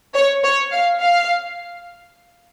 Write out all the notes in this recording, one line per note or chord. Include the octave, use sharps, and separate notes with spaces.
C#5
C#5
F5
F5